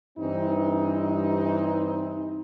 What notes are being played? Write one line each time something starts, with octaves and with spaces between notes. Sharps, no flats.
G2 E3 C4 D#4